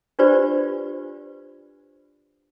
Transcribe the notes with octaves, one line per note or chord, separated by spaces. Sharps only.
D4 F4 G4 B4 C5 D5